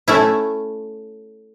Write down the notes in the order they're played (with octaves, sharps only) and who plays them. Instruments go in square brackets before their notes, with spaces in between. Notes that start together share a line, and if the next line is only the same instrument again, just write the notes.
[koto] A3 C#4 E4